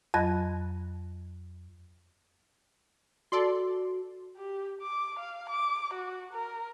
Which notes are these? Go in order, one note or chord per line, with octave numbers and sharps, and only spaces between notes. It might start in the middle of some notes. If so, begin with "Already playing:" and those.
F2 F#3 D#5 B5 F#6 A#6
F#4 A4 D5 C6
G4
D6
F5
D6
F#4
A#4